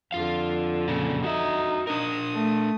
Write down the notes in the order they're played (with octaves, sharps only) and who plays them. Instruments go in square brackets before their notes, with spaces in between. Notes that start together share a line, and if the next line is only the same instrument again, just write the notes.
[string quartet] F2 D3 [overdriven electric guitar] F4 F5
[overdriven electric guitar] A#2 C#3
[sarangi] D#4 [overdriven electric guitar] F#4 E5
[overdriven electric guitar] D4 A#4 [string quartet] D#6
[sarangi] A3